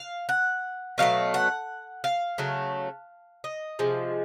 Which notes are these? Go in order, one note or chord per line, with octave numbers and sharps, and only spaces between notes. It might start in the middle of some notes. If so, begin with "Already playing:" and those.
Already playing: F5
F#5
B2 F#3 A3 F5
F#5
F5
C#3 F#3 A3
D#5
C3 F3 G#3